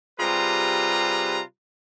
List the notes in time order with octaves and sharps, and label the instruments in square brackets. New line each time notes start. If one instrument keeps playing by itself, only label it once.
[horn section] C3 G3 F4 G#4 B4 A#5